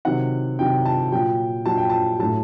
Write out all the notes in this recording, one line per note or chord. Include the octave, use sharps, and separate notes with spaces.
C3 D#3 F#3 F#5
C3 D#3 F#3 G5
A5
A#2 F#3 G5
A#2 F#3 A5
G5
A5
A2 F#3 A5